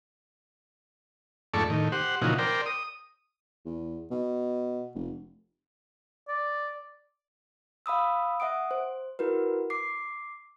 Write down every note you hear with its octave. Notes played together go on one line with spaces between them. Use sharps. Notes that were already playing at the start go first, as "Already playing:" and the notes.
F2 G#2 A3 A4 D5 C#6
A2 D#3
G4 C5 F#5
A#2 C#3 E3 F3 D#4 F#4
A#4 C5 D5 G5
D#6
E2
B2
F1
D5
F5 B5 D#6 E6
E5 F#5 D#6 D7
C5
E4 F#4 A#4 B4
D6 C7